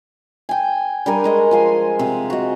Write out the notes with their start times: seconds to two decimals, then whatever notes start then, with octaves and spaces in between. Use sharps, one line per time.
0.49 G5 G#5
1.06 G3 D4 A#4 G#5
1.24 G#3 D#5 C#6
1.51 F3 G#5 C6
1.99 C3
2.30 F#4 D#5